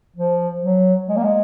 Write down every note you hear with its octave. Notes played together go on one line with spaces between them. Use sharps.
F3
F#3
G#3
A#3
G#3